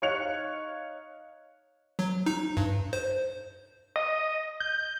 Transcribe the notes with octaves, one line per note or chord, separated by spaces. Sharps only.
D#4 C#5 F5 F#6 C#7 F7
F#3
D#4
G2
C5
D#5
G6